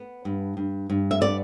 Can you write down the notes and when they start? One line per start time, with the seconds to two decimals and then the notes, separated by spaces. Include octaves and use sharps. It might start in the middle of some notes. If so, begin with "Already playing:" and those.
Already playing: B3
0.25 G2
0.57 G2
0.90 G2
1.11 E5
1.21 B3 D5